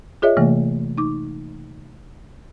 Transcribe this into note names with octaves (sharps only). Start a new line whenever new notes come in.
F4 G#4 C#5 D#5 E5
C3 E3 A3 A#3
D#4 D6